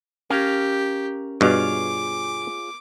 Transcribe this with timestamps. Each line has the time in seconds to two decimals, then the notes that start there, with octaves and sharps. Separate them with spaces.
0.30 C#4 G4 A#4 F5
1.41 G2 B2 F4 G#4 C#5 D6